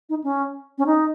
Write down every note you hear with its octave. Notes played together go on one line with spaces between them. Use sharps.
D#4
C#4
C#4
D#4